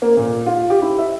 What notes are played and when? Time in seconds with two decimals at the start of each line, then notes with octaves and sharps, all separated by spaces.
0.02 A#3
0.17 A#2
0.46 F4
0.70 G4
0.82 E4
0.98 E5